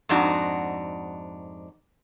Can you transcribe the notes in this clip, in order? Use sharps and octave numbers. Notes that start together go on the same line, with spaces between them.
F2 G#2 D4 D#4 F#4